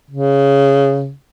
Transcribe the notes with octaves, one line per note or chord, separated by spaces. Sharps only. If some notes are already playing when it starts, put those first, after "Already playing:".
C#3